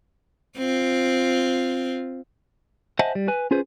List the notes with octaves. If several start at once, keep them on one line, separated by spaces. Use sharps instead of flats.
C4 F4
C5 D#5 E5 F#5 G#5 A5
G3
B4 G#5
C#4 F4 G#4 B4 C5